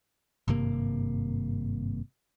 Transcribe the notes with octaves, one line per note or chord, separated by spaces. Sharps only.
G#1 G2 C3 A#3